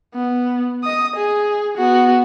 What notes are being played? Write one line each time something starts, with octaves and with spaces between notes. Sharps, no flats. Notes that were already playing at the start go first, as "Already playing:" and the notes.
B3
D#5 D#6
G#4
B3 F#4